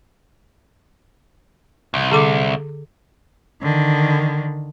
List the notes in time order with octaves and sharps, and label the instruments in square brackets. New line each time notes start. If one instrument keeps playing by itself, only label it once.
[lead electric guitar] C2
[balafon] D3 A4 D6
[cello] D3 D#3